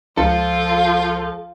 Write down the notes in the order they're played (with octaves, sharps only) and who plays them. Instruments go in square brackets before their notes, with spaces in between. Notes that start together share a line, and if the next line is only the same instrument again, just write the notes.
[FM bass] C#2 [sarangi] F3 [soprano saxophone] F4 [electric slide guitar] A4